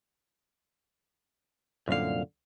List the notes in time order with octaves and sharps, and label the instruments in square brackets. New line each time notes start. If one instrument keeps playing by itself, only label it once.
[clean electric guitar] C2 F5 [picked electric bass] F#2 A#2 D3